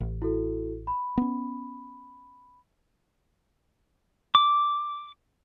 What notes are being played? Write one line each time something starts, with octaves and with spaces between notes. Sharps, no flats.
A1
E4 F#4 A4
B5
B3 C#4
D6